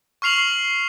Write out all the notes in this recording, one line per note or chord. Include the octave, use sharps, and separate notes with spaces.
C#6 F6 C7 F7 F#7